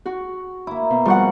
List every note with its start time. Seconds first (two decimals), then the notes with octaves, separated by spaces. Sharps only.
0.06 F#4
0.67 A#3 E4
0.90 B2
1.05 F3 G3 F#4 F#5